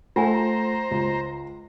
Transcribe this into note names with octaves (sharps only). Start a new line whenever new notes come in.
A3 F4 C5 F#5 G#5 A#5
C#2